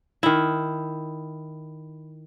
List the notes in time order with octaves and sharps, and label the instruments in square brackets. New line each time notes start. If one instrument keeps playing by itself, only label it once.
[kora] D#3 E4